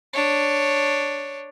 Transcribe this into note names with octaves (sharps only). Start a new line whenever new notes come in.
D4 C#5